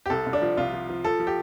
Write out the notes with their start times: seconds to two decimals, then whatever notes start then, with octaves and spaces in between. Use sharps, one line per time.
0.06 G4
0.10 C2 A4
0.26 C2
0.33 D4
0.42 F3
0.57 C2 F4
0.73 F3
0.89 F3
1.04 F3 A4
1.20 F3
1.27 G4